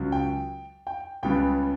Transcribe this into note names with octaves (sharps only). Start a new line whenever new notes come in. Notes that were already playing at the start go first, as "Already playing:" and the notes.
Already playing: C#2 C#3 F#3 C#4
G5
G5
C#2 C#3 G3 B3 G5